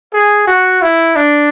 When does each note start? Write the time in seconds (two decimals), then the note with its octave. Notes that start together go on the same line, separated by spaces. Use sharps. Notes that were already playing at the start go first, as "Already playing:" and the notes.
0.13 G#4
0.47 F#4
0.82 E4
1.16 D4